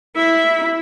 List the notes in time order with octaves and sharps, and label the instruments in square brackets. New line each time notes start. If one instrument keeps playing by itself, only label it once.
[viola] E4 E5